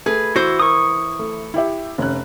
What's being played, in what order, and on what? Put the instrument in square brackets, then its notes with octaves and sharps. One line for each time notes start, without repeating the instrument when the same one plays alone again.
[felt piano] A3 [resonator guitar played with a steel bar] G#4 B4
[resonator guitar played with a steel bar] E3 E4 C5 [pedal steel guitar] F#4
[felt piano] A#4 [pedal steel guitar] C#6 D#6
[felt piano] A3
E4 G4 E5
F1 C#4 F#6